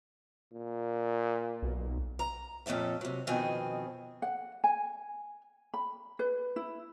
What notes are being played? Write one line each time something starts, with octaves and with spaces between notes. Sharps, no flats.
A#2
B1
A#5
F2 A#2 C#4 A4 E5
C3 F#3
F2 B2 D#3 C4 G#5
F#5
G#5
B5
B4
E4